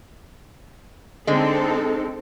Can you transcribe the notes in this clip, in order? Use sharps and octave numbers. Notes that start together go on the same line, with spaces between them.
D3 G#3 C4 D#4 A4